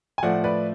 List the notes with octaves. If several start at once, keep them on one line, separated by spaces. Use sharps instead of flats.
G#5
A2 F3 A3 D5 F#5
B4 D5